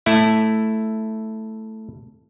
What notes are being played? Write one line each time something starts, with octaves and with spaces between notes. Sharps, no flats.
A3 E4